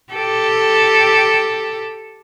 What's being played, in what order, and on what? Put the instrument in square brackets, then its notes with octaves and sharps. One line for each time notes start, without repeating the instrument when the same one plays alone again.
[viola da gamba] G4 A4